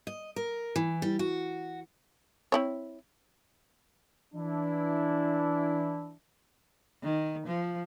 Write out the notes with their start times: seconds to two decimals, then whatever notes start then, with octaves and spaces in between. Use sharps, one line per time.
0.07 D#5
0.36 A#4
0.76 E3
1.02 G3
1.19 F#4
2.52 C4 E4 C#5
4.34 E3 D4 E4
7.03 D#3
7.47 F3